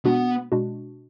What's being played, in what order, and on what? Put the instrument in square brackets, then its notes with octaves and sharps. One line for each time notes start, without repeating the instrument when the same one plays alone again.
[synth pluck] B2 G#3 D4 F#4 [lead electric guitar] B3
[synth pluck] B2 G#3 D4 F#4